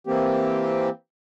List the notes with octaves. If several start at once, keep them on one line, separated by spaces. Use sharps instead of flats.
E3 A#3 C4 G4